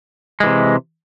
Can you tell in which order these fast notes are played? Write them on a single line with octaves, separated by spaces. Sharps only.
G#3 E3 C3